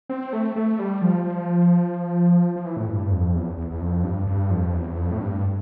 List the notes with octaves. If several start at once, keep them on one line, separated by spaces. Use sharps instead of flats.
C4
A3
A3
G3
F3
F3
F3
E3
A2
G2
F2
E2
E2
E2
F2
G2
G2
F2
E2
F2
A2
G2